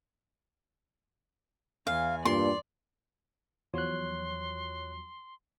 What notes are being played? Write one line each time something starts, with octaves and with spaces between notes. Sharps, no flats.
E2 F5 G#5
G2 A#2 D5 C6
E2 F3 F#3 C#5 C6 F#6